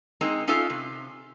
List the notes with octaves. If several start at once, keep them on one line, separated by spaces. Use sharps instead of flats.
G#3 A#3 C4 D#4
C#4 D#4 F4 A4 E5 F5
C3